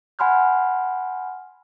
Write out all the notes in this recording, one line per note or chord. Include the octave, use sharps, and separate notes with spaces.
F#5 G#5 B5 C6 F6 G6